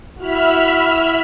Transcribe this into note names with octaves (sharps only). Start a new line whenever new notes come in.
E4 F#4 E5 B5 F6